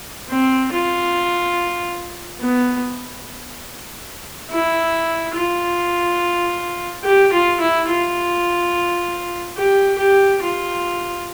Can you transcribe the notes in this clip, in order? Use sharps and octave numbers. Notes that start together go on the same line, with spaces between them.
C4
F4
B3
E4
F4
G4
F4
E4
F4
G4
G4
F4